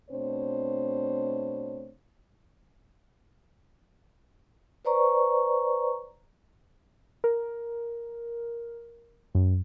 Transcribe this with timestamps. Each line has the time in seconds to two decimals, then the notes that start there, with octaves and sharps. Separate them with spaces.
0.11 B2 A3 C4 D4 C5 C#5
4.85 B4 C5 D5 A#5 C#6
7.24 A#4
9.35 F#2